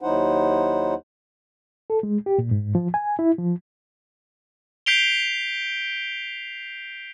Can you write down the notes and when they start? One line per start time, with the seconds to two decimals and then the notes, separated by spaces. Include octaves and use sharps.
0.02 D#2 F#3 D#4 E4 C5 F#5
1.90 A4
2.03 G#3
2.26 G4
2.38 A#2
2.51 G#2
2.75 F3
2.94 G#5
3.19 E4
3.38 F3
4.86 G6 B6 C7 D7 F7 G7